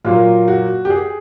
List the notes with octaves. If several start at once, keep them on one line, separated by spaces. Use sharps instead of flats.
A#2 F#3 A#3 F4
F#4
G4
G#4